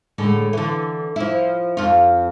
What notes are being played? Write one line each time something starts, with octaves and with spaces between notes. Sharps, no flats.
A2 D3 G#3
D3 E3
F3 E4
F2 F4